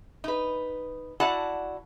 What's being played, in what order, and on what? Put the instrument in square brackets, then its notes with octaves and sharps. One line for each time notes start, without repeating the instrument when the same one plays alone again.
[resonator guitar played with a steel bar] D#4 B4
E4 F#4 D5 F#5 A5